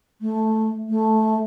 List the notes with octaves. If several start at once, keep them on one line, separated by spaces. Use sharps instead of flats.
A3
A3